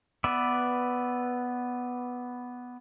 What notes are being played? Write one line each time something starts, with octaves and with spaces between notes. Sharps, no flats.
B3 B4 D5 E5